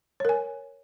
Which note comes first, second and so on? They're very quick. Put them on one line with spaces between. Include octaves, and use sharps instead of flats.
C#5 A#4 G#5